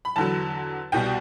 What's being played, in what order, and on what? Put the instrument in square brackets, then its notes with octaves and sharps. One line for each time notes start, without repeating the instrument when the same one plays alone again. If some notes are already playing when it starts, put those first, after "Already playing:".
[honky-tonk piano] B5
E2 D3 F#3 A5
C2 B2 G3 G5